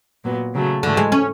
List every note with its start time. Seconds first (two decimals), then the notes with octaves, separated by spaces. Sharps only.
0.23 A#2 F#3 B3
0.53 C#3 F#3 A3
0.83 G#2 D3 E3 A3
0.97 G#3
1.12 C#4